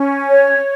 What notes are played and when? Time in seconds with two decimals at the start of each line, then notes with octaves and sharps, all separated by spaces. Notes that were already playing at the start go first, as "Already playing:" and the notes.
Already playing: C#4
0.28 C#5